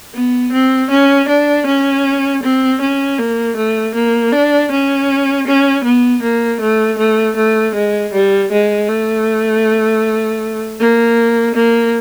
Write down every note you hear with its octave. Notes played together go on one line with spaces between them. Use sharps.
B3
C4
C#4
D4
C#4
C4
C#4
A#3
A3
A#3
D4
C#4
C#4
B3
A#3
A3
A3
A3
G#3
G3
G#3
A3
A#3
A#3